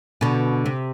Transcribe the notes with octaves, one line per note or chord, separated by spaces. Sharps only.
B2 D3
C3